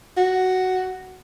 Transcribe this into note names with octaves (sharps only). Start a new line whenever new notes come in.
F#4